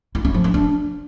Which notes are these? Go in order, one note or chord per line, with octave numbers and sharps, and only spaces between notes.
E4
C#4
F3
C#4
D4